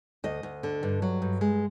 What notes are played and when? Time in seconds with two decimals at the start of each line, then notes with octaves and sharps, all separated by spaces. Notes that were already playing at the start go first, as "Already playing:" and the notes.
0.24 D2 D#5
0.43 D2
0.63 D3
0.83 G2
1.02 F#3
1.22 G2
1.41 G#3